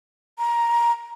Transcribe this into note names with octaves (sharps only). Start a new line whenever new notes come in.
A#5